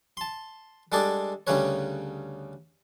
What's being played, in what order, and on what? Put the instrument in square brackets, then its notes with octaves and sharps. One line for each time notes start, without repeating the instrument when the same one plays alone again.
[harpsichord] A5 C6
G3 G#3 D4 G#4 A4 D5
D2 C#3 G3 C#4 B4 C#5